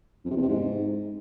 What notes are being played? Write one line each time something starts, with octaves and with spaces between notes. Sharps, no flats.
F2
C3
E2
C3
G#2